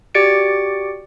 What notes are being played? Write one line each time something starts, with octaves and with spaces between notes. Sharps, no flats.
F#4 G4 D5 A6 C#7 D7